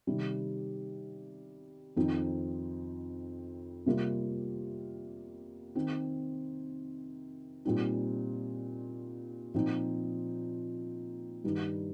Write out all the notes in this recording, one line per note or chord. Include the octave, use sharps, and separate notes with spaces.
C3 D#3 G3
F2 D#3 C4 D#4
C3 G3 A#3 F4
D#3 C4 D#4
A#2 G3 C4 D#4
A#2 F3 C4 D#4
G2 D#3 G3 D#4